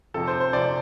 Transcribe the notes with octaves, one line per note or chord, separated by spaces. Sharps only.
F2 C3 F3 A4
C5
C5
F2 C3 F3 D5